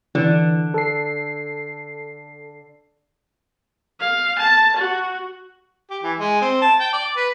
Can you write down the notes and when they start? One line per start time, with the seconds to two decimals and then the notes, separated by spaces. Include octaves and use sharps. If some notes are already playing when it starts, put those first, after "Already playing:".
0.15 D3 E3
0.74 A4 C7
4.00 F5
4.39 A5
4.76 F#4
5.91 G4
6.03 E3
6.20 G#3
6.41 C4
6.62 A5
6.80 G5
6.93 D5
7.17 B4